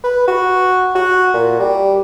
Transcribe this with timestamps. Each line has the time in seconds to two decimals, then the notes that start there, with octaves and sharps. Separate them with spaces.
0.04 B4
0.28 F#4
0.95 F#4
1.34 A#2
1.60 G3